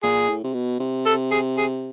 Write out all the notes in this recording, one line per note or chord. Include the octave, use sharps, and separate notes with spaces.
A#2 G#4
A2
C3
B2
C3
A4
G#4
G#4